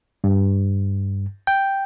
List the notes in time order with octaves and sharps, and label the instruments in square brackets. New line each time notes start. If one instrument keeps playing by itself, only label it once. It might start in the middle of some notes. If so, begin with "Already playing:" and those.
[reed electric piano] G2
G5